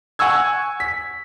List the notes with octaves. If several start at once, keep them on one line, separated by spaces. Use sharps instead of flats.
F#5 G#5 C#6 E6 G#6
B6